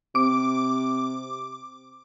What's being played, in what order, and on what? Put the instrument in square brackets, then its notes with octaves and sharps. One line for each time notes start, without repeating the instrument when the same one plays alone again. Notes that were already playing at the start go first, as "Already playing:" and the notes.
[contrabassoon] C3 [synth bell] D6